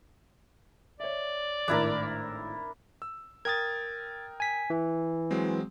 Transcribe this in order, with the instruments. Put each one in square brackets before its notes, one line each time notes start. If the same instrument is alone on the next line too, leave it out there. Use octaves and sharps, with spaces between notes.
[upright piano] C#5 E5 [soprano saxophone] D5
[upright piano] G#1 A2 [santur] D4 E4 A#4
[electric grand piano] E6
[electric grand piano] A#4 G5 D#6 [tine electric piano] G#6 A6
[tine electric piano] G#5 B6
E3
[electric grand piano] F#3 G#3 C4